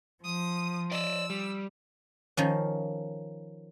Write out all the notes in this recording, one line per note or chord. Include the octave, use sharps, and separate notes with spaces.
F3 D#6 D#7
D5 D#5 E6
G3
D#3 F3 C#4